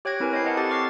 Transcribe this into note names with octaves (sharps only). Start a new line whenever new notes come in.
G4 C#5 G5 F#6 G#6 A#6
C4 E4 A#4 B4 G#5
C4 C#5 D#5 B5 G6 C7
C4 C#5 D#5 F#5 A5
G4 A4 F#5 A5 A6
D#5 C#6 D6 F6 A6 C7